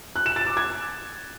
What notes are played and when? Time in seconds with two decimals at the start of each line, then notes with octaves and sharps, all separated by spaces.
0.16 F#6
0.26 E7
0.36 A6
0.46 D6
0.57 G#6